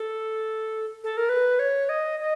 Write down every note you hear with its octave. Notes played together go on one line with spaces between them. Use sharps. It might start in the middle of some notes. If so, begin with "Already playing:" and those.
Already playing: A4
A4
A#4
B4
C#5
D#5
D#5